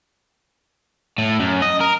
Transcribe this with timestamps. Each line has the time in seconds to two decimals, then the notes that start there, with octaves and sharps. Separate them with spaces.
1.18 A2
1.40 F#2
1.62 D#5
1.81 A#4